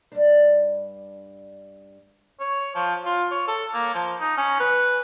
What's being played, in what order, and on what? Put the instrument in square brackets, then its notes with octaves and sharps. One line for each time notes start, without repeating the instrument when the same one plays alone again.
[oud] G2 D4
[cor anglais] C#5
F3
F4
C#5
A4
A#3
F3
D#4
C#4
B4